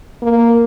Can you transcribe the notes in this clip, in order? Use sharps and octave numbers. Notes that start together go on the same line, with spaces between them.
A#3